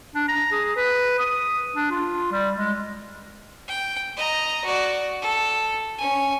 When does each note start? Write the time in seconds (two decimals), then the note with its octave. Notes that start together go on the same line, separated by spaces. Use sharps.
0.15 D4
0.28 A#5
0.51 G#4
0.76 B4
1.19 D#6
1.76 D4
1.91 F4
2.32 G3
2.57 G#3
3.68 G5
4.17 D#5 A#5
4.64 F#4 D5
5.22 A4
5.98 C#4 G#5